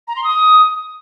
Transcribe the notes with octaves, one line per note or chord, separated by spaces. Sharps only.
A#5
C6
D#6